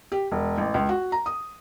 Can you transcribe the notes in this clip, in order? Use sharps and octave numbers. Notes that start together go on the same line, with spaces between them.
G4
E1
A1
C#2
F#4
A#5
D#6